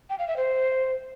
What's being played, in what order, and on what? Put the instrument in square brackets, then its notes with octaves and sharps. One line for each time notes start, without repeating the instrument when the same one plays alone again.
[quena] G5
F5
E5
C5